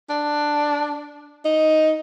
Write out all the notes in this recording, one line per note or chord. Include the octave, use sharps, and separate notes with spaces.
D4
D#4